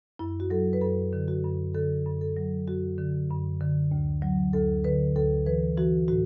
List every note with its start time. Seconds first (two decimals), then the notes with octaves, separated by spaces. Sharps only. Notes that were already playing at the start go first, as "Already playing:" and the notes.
0.19 F#2 E4
0.40 F#4
0.50 F#3 A4
0.73 B4
0.81 F#2 A4
1.13 D3
1.28 F#4
1.44 F#2
1.75 D3 A4
2.05 F#2
2.21 A4
2.37 F#3
2.68 F#2 F#4
2.98 D3
3.30 F#2
3.61 D3
3.91 D2
4.22 F#3
4.53 D2 A4
4.84 D3 B4
5.16 D2 A4
5.46 E3 B4
5.77 E3 F#4
6.08 A2 F#4